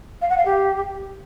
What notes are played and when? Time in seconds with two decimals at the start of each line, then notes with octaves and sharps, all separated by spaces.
0.21 F5
0.29 F#5
0.37 F5
0.45 G4